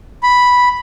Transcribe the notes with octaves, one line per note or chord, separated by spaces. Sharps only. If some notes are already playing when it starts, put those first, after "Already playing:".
B5